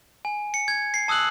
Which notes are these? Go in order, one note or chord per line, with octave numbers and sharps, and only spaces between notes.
G#5
C#7
G#6
C7
A5 D#6 E6 F#6 F#7